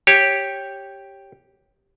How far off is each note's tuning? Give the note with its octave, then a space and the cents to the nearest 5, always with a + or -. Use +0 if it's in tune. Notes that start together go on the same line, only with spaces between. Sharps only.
G4 +0 C#5 -10